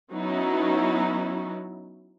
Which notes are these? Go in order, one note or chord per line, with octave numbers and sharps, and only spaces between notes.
F#3 B3 C#4 D#4 E4